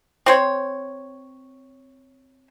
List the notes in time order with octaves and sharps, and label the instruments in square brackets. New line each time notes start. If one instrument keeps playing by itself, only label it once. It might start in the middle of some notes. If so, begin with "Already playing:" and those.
[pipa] C4 C5 C#5